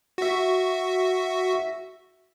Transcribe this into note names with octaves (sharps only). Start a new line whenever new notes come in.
F#4 E5